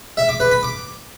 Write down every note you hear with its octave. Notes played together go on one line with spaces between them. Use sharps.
E5
D6
B4
B5
D6